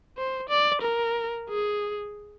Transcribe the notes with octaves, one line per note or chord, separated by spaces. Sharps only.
C5
D5
A#4
G#4